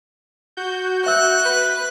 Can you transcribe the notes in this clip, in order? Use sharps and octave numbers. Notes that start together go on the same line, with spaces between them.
F#4 G6
E5 E6 F#6
B4